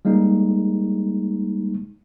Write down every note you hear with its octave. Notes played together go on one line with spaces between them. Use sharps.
G3 G#3 A#3 D#4